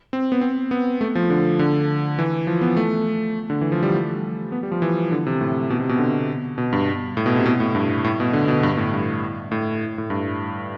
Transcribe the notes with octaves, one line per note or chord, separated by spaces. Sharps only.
C4
B3
C4
B3
A3
F3
D3
D3
E3
F3
B3
A3
D3
E3
F3
G3
A3
B3
G3
F3
E3
D3
C3
A2
B2
C3
B2
D3
B2
G2
A2
B2
C3
B2
A2
G2
A2
B2
D3
B2
G2
A2
G2
A2
A2
G2